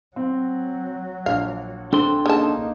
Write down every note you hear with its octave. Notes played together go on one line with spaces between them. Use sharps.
F#3 C4
A#1 F5
C4 D4 A4 C6
C#3 A#3 D#4 A5